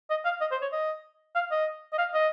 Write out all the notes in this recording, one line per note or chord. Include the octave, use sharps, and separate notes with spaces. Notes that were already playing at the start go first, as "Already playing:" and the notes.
D#5
F5
D#5
C5
C#5
D#5
F5
D#5
D#5
F5
D#5